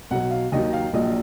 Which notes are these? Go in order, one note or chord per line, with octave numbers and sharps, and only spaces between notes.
B1 B2 F#3 F#5
F5
D#2 D#3 F#3 D#5
F5
A#1 A#2 F#3 D#5